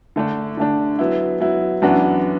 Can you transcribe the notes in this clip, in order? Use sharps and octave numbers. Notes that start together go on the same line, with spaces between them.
D3 A3 D4
D3 A3 D4
F#3 B3 E4
F#3 B3 E4
F#2 E3 B3 D4 F#4